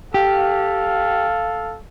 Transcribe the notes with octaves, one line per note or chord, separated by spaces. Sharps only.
G4 A4 F5